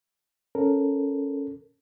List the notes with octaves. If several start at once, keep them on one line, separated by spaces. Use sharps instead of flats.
C#4 A4 A#4